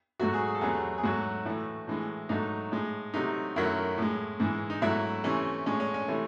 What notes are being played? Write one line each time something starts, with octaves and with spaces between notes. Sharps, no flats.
G#2 F#3 A3 F#4
G#4
G#4
A4
E2 C3 F#3 A3 G#4
G#4
G#2 F#3 A3 F#4
A2 E3 A3
A2 E3 G#3
G#2 F#3 A3 D#4
A2 G#3
C3 F#3 A3 D#4
F#2 D#3 F#3 A3 E4
A2 G#3
G#2 E3 G#3
D#4
G#2 F#3 A3 E4
C3 E3 A3 C#4
A2 G#3 C#4
C#4
C#4
C3 E3 A3